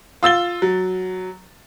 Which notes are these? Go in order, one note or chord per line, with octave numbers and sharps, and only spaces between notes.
F4 E6 A6 G7
F#3